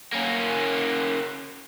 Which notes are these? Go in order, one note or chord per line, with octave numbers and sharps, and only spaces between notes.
A#3 C#4